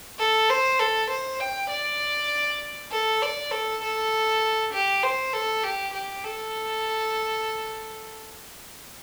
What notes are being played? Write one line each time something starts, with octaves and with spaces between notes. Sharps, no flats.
A4
C5
A4
C5
G5
D5
A4
D5
A4
A4
G4
C5
A4
G4
G4
A4